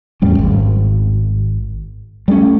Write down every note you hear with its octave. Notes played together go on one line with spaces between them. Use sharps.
E2 A2 G3 C#4
G#1
G3 A3 A#3 C#4